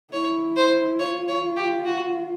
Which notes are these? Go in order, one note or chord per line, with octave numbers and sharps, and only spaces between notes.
E4 C#5
C5
F4 C#5
C#5
G4
F#4